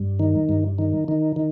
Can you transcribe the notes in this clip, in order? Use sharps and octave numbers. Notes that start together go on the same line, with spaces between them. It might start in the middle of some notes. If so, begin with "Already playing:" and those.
Already playing: G2
D#3
G2
D#3
D#3
D#3